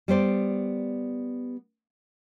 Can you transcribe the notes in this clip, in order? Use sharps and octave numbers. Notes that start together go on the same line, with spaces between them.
G3 B3 C5 D5